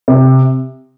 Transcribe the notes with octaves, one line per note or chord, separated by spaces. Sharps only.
C3